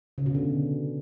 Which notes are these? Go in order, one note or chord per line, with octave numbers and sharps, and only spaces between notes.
C#3
B2
D3